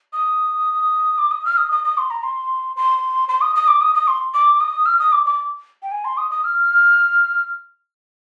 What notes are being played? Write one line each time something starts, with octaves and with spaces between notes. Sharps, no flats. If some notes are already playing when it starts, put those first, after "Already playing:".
D#6
D6
D#6
F6
D#6
D#6
D#6
C6
A#5
C6
C6
C6
D#6
D#6
D6
D#6
D#6
C6
D6
D#6
F6
D#6
D6
D6
G5
G#5
C6
D#6
D#6
F6